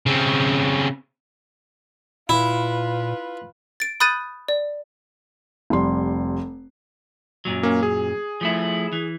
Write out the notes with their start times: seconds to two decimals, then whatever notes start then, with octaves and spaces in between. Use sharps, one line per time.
0.06 C#3 C4
2.29 A#2 E4 F4 B4
3.80 A6 D7
4.00 B5 D#6 F#6 G6 A6 D#7
4.48 D5
5.70 F1 G3 C6
7.45 F#2 A#2 F#3
7.63 A#3 C#4
7.83 G#4
8.41 F3 A3 E4
8.93 E3